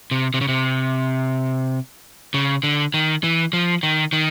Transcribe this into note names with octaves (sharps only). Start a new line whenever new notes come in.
C3
C3
C#3
C3
C#3
D3
D#3
E3
F3
D#3
D#3